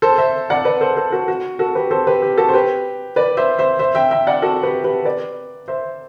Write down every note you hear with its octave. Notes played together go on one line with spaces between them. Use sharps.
A4 C5
C5 E5
D5 F#5
B4 D5
A4 C5
A4 C5
F#4 A4
F#4
F#4 A4
G4 B4
A4 C5
G4 B4
G4
F#4 A4
C5
G4 B4
B4 D5
C5 E5
C5 E5
C5 E5
E5 G5
E5 G5
D5 F#5
F#4 A4
G4 B4
G4 B4
B4 D5
C5 E5